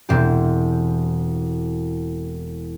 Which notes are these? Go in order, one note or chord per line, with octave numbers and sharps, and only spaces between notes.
E1 C4 G4